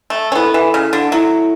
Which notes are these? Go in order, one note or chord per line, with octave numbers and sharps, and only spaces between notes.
A3
C#4
B3 E4 A4 E5
E3
C#3
D3
F#3 E4 A4 E5